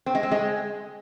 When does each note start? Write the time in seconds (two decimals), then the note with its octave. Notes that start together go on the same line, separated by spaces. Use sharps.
0.06 C4
0.15 G#3
0.23 C4
0.32 G#3